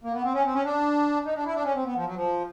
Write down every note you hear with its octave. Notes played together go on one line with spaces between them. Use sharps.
A#3
B3
C4
C#4
C4
C#4
D4
D#4
D4
E4
D4
C#4
C4
B3
F3
F#3
F3